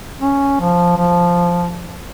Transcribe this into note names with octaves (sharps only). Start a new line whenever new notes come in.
C#4
F3
F3